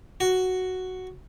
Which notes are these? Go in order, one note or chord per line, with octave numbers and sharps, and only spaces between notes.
F#4